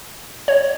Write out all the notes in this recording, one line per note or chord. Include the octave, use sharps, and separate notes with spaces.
C#5